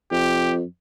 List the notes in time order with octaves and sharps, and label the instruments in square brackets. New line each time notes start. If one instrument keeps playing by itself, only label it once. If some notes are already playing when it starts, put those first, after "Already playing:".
[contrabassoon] F2 [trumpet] G4